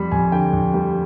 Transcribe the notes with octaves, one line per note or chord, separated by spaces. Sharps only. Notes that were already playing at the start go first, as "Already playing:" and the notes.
Already playing: F2 G3 B5
F2 G#5
D3 G5
F2
G3